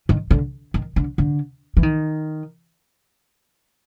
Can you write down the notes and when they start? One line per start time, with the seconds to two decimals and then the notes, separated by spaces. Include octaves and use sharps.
0.09 D#3
0.31 D3
0.74 D#3
0.96 D3
1.18 D3
1.77 E3
1.83 D#3